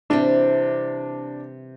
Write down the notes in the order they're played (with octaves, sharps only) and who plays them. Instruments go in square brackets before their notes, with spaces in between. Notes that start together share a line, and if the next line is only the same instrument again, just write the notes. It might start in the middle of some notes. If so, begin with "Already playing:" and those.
[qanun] C3 E3 G3 C4 [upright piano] D4